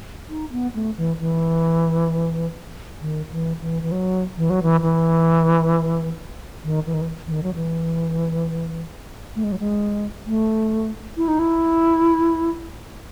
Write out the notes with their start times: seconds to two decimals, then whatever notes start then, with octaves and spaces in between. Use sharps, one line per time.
0.30 D#4
0.52 B3
0.75 A3
0.97 E3
1.20 E3
3.01 D#3
3.32 E3
3.61 E3
3.83 E3
3.92 F#3
4.37 E3
4.50 F#3
4.63 E3
4.82 E3
6.64 D#3
6.86 E3
6.94 D#3
7.01 E3
7.27 E3
7.32 D#3
7.43 F#3
7.55 E3
9.36 A3
9.44 G#3
9.52 F#3
9.59 G#3
10.27 A3
11.17 E4
11.28 D#4
11.39 E4